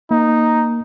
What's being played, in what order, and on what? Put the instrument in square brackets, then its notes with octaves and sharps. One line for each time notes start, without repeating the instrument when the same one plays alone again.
[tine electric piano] A#3 [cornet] D#4